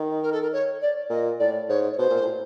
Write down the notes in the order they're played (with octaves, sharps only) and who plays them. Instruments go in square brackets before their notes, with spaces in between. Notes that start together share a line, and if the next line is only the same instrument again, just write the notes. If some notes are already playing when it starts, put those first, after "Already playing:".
Already playing: [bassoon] D#3
[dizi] A#4
A4
A#4
C#5
D5
[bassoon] A#2 [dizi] D#5
[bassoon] A2 [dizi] D5
[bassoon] G#2 [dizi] C#5
[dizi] C#5
[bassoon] B2 [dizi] C5
[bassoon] A#2
A2